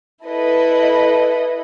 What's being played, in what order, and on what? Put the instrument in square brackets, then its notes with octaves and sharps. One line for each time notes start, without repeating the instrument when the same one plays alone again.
[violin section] E4 A4 B4 D#5